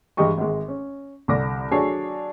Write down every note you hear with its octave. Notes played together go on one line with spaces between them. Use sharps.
G2 E3 G#3 G4 D#5 C#6
G#1 G#3
C#4
C2 D3 D5 D6 A#6
F#3 D4 G#4 A4 C#5 C7